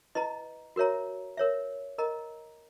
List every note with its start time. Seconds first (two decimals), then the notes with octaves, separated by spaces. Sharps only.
0.15 E4 B4 D#5 A#5
0.76 F#4 A#4 C#5 E5 A#5
1.37 A#4 C#5 E5
1.98 A#4 D#5 A#5